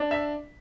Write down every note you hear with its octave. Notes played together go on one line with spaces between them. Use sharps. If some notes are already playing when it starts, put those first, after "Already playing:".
Already playing: D4
E5